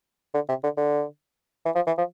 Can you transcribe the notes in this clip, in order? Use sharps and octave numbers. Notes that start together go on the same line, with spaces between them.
D3
C3
D3
D3
E3
F3
E3
F3